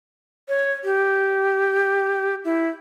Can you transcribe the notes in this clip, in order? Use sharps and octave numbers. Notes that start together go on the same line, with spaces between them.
C#5
G4
E4